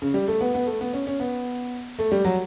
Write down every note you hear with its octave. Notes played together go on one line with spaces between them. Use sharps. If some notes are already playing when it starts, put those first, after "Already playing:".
C#3
G3
A3
B3
B3
A3
B3
C#4
C#4
B3
A3
G3
F#3